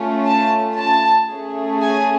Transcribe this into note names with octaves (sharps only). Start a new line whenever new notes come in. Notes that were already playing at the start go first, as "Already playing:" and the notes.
Already playing: A3 C#4 F4
A5
A5
A3 C#4 G#4
G#5